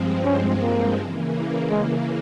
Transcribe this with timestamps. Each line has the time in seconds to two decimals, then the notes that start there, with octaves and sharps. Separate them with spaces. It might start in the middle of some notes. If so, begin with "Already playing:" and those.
Already playing: G2 F3 G#3 C4
0.25 C#4
0.61 A#3
0.98 C#3 E3 A#3
1.71 G#3